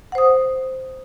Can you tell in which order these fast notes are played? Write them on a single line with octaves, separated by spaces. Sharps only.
F#5 C5 D#6